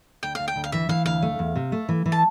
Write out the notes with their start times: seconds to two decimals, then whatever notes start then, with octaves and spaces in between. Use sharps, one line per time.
0.23 D2 G5
0.35 D2 F5
0.48 G5
0.56 D2
0.64 F5
0.72 E3 E5
0.89 E3 F5
1.05 D2 F5
1.22 A3
1.39 E2
1.56 C3
1.72 A3
1.89 E3
2.06 E3
2.12 A5